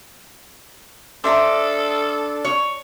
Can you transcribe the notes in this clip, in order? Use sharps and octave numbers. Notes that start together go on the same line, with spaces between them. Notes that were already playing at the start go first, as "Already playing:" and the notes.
D4 A4 C5 E5 A#5
C#5